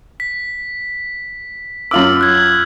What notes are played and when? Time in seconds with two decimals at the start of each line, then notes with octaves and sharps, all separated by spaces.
0.20 B6
1.91 F#2 F4 D6 E6 F6 F#7
2.21 F#6 G#6